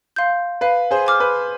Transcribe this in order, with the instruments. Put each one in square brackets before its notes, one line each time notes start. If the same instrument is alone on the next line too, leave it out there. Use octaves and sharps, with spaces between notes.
[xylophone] F5 C6 G6
[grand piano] B4 [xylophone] F5
[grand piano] G#4 C5
[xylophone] G#5 D6 F6
[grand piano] B4